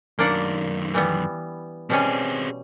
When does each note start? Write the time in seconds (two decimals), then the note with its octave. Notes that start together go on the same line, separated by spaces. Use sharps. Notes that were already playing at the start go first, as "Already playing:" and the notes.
0.19 F#2 D#3 A#3 D4 F#5
0.94 E3 G3 B3
1.90 B2 G3 C4 C#4 G#4